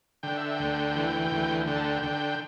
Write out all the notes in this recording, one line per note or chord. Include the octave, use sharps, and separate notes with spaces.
D3 G5
E5
G5
D2
E3
D2
D3 G5
A5
G5
D3 G5